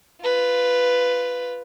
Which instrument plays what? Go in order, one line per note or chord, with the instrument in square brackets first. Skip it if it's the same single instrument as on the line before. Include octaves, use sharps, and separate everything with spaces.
[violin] F4 B4